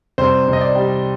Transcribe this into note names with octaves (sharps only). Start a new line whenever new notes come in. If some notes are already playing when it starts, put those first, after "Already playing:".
C2 C5
C2
D#5
D5
G3